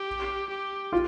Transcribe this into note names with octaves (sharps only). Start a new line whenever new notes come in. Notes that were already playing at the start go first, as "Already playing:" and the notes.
Already playing: G4
G4
F4